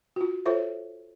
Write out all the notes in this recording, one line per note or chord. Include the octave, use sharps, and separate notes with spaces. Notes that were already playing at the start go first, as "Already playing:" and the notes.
F4 F#4
F4 A4 C5 C#5 E5